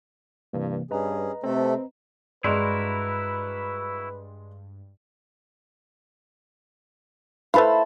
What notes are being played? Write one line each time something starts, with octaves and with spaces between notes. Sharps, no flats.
G2 C3 E3 A#3
G2 C#4 G#4 B4 D#5 A#5
C3 A3 C4 A4
G2 G#3 E4 F#4 A#4 B4 D5 C6
A3 E4 B4 C5 F5 A5